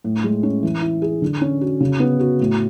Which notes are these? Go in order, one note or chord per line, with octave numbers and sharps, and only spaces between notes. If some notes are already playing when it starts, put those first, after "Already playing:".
A2
G#3
C#4
E3
E4
G#4
D3
C#4
F#4
C#3
B3
F#4
A2